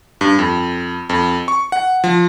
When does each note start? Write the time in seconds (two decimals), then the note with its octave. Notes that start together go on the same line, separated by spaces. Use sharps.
0.21 G2
0.39 F2
1.09 F2
1.48 C#6
1.72 F#5
2.04 F3